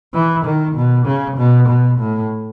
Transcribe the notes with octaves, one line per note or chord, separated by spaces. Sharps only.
E3
D#3
B2
C#3
B2
B2
A2